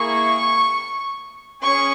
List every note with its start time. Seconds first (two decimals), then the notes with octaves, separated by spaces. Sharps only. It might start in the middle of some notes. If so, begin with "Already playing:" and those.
Already playing: A#3 E4 G#4 C#6
1.62 C#4 G#4 C#6